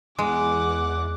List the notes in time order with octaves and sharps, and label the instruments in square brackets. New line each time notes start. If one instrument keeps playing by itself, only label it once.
[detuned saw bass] E2 [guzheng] G#3 [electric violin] F#5 D6